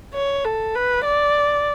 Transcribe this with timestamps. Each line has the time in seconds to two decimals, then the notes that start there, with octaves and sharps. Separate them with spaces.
0.14 C#5
0.45 A4
0.75 B4
1.05 D5